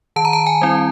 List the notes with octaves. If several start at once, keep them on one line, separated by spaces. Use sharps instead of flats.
D#3 A5
A#5
A5
G#5
G3 C4 E4